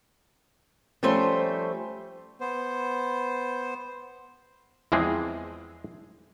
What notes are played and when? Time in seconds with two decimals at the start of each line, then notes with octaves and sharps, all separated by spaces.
1.03 F3 G3 A3 C#4 C5 E5
2.40 B3 C5
4.92 E2 E3 F3 G#3 C4 G#4